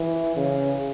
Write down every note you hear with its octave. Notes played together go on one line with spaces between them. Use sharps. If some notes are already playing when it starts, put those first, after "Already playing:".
Already playing: E3
C#3